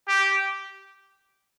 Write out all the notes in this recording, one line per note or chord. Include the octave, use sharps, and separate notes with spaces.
G4